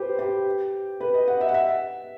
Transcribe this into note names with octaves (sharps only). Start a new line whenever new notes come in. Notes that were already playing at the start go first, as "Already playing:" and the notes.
Already playing: G4 B4 C5
G4
B4
D#5
F#5
E5
F#5
E5